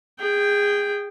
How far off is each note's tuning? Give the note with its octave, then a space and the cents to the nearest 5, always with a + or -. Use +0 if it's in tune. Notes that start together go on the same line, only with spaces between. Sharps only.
G#4 -20 G5 +0